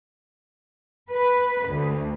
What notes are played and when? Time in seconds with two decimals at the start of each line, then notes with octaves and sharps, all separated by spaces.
1.11 B4
1.67 D2